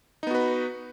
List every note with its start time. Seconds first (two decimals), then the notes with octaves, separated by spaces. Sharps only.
0.23 D#4
0.27 B3
0.31 F#4
0.35 B4